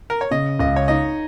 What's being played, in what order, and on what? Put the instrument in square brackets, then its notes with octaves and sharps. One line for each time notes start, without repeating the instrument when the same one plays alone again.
[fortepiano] A#4
C#5
[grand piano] C#3 [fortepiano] D#5
[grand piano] C#2 [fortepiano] D#5
[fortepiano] C#5
[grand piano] D#4 [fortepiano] D#5